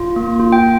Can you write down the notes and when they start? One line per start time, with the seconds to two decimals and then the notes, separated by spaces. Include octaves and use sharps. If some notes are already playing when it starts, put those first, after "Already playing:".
Already playing: F4
0.16 A#3
0.40 F4
0.52 G5